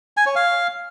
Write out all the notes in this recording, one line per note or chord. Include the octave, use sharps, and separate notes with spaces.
G#5
C#5
F5